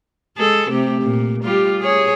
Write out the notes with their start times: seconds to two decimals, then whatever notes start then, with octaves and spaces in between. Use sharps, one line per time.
0.37 G#3 G#4 A4
0.70 C3 A3 G4
1.02 A#2
1.44 G3 F4 G4
1.81 G#4 C#5